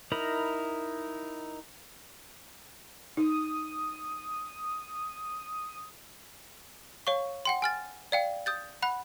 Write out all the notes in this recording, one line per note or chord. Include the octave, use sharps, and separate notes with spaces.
D#4 E4 A#4 A#5 B5
D#4 D#6
C#5 F5 C#6
F#5 G5 C6
G#5 F6 A6
D5 F5 G5
D#6 G6 A6
F#5 B5 F#6